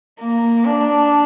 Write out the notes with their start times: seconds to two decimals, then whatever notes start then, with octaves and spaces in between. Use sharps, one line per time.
0.20 A#3
0.65 D4